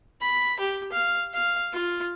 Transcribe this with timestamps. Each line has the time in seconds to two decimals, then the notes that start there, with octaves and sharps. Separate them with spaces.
0.21 B5
0.60 G4
0.92 F5
1.33 F5
1.73 F4